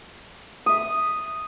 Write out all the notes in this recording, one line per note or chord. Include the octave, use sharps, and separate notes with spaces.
E5 D#6